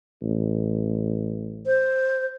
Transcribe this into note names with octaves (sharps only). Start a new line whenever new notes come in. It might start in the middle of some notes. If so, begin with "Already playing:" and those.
A1
C5